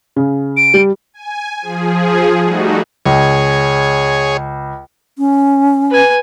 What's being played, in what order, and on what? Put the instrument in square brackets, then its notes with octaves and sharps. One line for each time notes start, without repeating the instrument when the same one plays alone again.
[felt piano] C#3
[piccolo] D7
[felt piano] G3
[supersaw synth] G#5
F3 G#4
G3 A3 D#4 F#4
[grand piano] C#2 [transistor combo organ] G#4 C#5
[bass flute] C#4
[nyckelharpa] B4 G#5